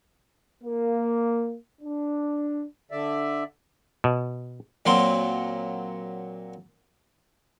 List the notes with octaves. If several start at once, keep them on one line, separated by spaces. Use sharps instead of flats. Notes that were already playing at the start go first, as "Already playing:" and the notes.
A#3
D4
D3 D5 E5
B2
A#2 F#3 C4 C6